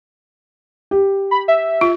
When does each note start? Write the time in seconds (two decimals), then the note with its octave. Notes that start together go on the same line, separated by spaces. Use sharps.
0.91 G4
1.31 B5
1.48 E5
1.81 F4